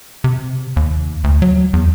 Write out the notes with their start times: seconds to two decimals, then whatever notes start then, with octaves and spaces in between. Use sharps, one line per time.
0.24 C3
0.76 D#2
1.24 D2
1.42 F#3
1.73 E2